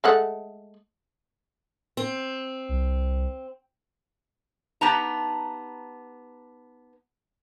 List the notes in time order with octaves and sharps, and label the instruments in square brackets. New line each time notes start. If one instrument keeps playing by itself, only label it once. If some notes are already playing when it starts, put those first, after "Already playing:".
[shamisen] G#3 A3 F#5
[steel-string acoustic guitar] C4
[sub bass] C2
[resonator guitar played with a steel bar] B3 D#4 G4 B4 A5 A#5